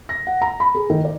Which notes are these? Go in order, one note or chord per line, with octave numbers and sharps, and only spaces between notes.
A#6
F#5
A#5
B5
G#4
D#3
D5